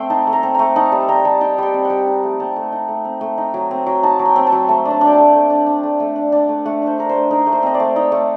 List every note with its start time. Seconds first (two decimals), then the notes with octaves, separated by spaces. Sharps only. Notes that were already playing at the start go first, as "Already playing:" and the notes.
Already playing: A3 C4 C5 G5
0.10 D#4 A5
0.27 A3
0.33 A#5
0.43 C4
0.55 A3 A#5
0.76 D#4 A5
0.92 G3 A5
1.08 C4 A#5
1.25 G3 A5
1.41 D#4 G5
1.58 G3 G5
1.74 C4
1.85 F#5
1.90 G3
2.07 D#4 A5
2.23 A3
2.40 C4 A5
2.56 A3
2.72 D#4
2.88 A3
3.05 C4
3.21 A3
3.38 D#4
3.54 F#3
3.71 C4
3.86 F#3
4.03 D#4 A5
4.19 F#3
4.26 G5
4.36 C4
4.47 A5
4.52 F#3
4.69 A3 A5
4.85 D4
4.91 A5
5.01 D4
5.07 G5
5.12 A5
5.18 A3
5.34 A3
5.50 D4
5.66 D4
5.83 A3
6.00 A3
6.16 D4
6.32 D4
6.49 A3
6.65 A3 F#5
6.82 D4
6.87 C5
6.98 D4 A#4
7.09 A3 C5
7.31 D#4 A#4
7.47 A3
7.52 C5
7.63 C4 D#5
7.74 D5
7.80 A3
7.96 D#4
8.12 A3